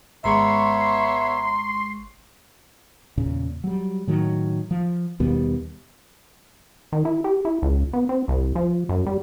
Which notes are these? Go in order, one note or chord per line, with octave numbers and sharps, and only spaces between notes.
G#1 G#3 B3 C#5 E5 A#5 C6 C#6
E2 A#2 C#3
F#3 G3
A2 D#3 F#3
F3
D#2 B2 G3 B3
D#3
E4
G4
E4
C#2
B3
C4
C2
F3
F#2
G3